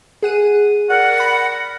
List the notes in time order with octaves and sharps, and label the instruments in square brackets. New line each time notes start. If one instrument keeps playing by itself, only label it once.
[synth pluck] G#4 F#5 D#7
[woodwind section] A#4 D5 F#5
[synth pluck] B5 A#6